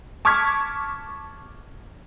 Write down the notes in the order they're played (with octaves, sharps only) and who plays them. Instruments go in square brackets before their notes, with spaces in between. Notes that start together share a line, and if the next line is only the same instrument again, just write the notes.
[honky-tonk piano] A5 C#6 D6 F6 G#6 B6